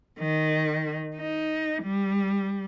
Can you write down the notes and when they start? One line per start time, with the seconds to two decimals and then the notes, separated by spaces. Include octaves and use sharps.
0.19 D#3
1.16 D#4
1.83 G3